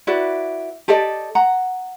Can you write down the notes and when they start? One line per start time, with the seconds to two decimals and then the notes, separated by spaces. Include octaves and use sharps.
0.07 E4 F#4 B4 D5
0.88 G4 A4 D5 D#5
1.35 F#5 A#5